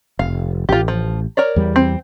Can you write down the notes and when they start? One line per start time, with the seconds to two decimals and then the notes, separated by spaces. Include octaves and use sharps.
0.19 F1 F5
0.69 A1 F4 G4
0.88 F3
1.37 A#4 C#5 D5
1.56 E2 G3
1.76 C4